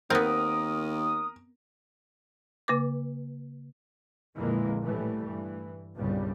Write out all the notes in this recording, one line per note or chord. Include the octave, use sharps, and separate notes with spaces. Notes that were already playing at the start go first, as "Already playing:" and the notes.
D#2 B3 C4 A#4 D#6
C#3 A#3 B4 D6
A#1 F2 D3 E3 G#3 A#3
A2 E3 G3 A3
G2 E3
G1 C2 G2 A#2 C#3 G3